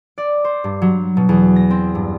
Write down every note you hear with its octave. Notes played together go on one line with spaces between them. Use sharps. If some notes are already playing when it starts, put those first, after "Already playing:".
D5
C5
G2
F#3
B2
E2
A#6
C4
G2